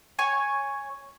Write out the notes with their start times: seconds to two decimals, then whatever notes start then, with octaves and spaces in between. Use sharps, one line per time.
0.19 C#5 G#5 C#6